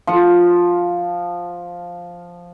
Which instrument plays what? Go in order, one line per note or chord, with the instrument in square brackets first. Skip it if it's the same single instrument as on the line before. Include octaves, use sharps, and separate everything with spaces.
[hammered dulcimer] F3 F#5